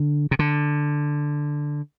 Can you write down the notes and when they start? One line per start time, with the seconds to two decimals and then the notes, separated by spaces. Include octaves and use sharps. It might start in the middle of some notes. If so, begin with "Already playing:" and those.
Already playing: D3
0.31 C3
0.39 D3